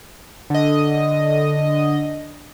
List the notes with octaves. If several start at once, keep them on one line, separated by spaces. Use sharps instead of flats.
D3 D#5